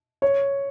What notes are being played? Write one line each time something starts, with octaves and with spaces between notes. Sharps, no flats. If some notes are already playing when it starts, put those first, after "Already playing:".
C#5